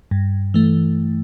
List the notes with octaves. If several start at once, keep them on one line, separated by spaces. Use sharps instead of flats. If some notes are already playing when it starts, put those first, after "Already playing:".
G2
E3 A3